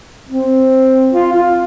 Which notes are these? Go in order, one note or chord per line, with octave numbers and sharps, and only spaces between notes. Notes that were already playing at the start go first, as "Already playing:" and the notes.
C4
F4
F4